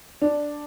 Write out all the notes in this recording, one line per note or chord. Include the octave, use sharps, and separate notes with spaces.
D4